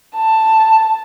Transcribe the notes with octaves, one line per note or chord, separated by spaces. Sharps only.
A5